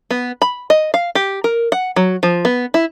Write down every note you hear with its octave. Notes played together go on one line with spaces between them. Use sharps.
B3
B5
D#5
F5
G4
A#4
F#5
F#3
F3
B3
E4